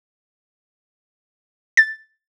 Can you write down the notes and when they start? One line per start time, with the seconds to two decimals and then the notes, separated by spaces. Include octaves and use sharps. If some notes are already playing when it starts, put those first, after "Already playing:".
1.77 A6